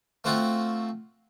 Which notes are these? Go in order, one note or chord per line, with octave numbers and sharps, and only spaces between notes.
A3 C4 F4 F#4